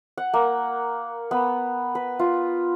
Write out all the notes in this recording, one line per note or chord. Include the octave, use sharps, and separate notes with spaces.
F#5
A#3
B3
B4
F4